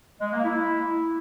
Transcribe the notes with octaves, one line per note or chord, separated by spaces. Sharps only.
G#3
A#3
E4